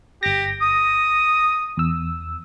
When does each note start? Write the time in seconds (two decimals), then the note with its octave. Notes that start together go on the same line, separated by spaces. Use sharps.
0.23 G1 G4 A#6
0.61 D#6
1.77 E2 E6